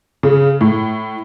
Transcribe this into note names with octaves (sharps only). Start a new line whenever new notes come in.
C#3
A2